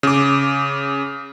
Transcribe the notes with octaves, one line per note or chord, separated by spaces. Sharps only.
C#3 D6